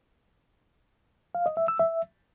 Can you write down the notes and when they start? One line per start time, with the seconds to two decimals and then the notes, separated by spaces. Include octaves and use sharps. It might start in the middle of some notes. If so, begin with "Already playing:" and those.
1.35 F5
1.46 D#5
1.57 E5
1.68 E6
1.79 E5